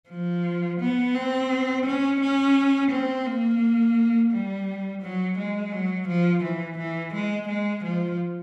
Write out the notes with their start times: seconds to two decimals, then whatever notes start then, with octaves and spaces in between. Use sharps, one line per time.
0.09 F3
0.80 B3
1.15 C4
1.85 C#4
2.20 C#4
2.91 C4
3.26 A#3
4.32 G3
5.02 F#3
5.38 G#3
5.72 F#3
6.08 F3
6.43 E3
6.78 E3
7.13 G#3
7.48 G#3
7.84 F3